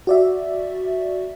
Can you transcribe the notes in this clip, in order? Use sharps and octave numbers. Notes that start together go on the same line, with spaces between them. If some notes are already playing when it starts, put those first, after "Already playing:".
F#4 D5 E5